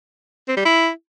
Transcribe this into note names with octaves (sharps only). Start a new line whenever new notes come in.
C4
G3
E4